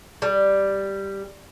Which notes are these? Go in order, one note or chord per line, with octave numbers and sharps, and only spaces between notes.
G3